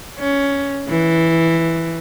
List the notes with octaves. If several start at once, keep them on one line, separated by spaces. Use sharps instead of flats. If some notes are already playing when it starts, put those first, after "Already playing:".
C#4
E3